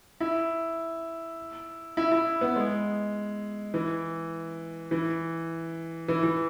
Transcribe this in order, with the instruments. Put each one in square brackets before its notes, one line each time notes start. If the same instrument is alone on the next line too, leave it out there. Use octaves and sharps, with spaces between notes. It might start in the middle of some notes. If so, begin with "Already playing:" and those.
[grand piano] E4
E4
E4
B3
G#3
E3
E3
E3
E3